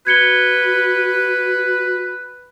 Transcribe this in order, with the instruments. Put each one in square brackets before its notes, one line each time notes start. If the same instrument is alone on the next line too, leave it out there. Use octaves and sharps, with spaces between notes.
[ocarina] F#4 [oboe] B4 [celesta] G#6 C#7 G7